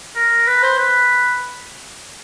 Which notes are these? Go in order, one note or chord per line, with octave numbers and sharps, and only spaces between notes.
A#4
B4
C5
B4